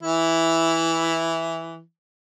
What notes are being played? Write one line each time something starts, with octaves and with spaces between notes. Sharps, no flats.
E3 E4